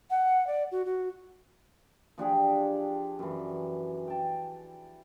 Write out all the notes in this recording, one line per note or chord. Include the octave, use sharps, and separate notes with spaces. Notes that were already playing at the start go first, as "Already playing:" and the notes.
F#5
D5
F#4
F#4
F3 D4 G4 G#4
F#2 E3
G5 A5